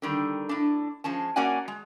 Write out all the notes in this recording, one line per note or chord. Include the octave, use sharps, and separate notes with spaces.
D3 D#3 G3
A2 D4
F3 G#3 C#4 A5
A#3 C#4 F#4 D5 F#5 G#5
G#3